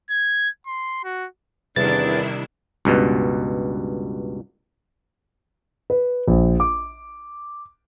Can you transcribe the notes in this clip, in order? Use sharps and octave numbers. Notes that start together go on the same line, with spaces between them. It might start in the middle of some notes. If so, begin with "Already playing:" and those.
G#6
C6
F#4
E2 C3 D#3 G3 D4 E4 A6
C#2 G2 B2
B4
A#1
D6